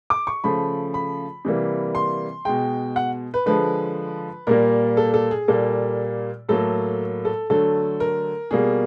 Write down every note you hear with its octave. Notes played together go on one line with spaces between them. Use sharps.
D6
C#6
C#3 F3 A3 B5
B5
C3 E3 G3 A#3
C6
B2 G#3 G5
F#5
B4
D3 F3 G#3 B4
A#2 G3 A#3 A#4
A4
A4
G#4
A#2 G3 A#3 A4
A2 F#3 A#3 A4
A4
D3 F#3 A3 A4
A#4
B2 G3 A#3 G#4